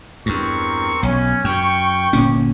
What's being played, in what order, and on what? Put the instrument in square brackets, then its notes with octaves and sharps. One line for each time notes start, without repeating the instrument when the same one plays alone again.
[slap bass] E2 G2 [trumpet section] C4 A#4 C#6
[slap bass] B1 [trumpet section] C#4
[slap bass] F#2 [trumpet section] G5 C#6
[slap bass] G1 A#2 C#4